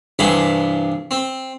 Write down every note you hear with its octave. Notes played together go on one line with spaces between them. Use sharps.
C2 G2 E3 G#4 A5 B5
C4